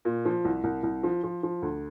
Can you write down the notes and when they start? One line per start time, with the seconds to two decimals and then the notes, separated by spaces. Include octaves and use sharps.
0.05 A#2
0.25 F3
0.45 C2
0.64 C2
0.83 C2
1.03 F3
1.24 F3
1.43 F3
1.62 D2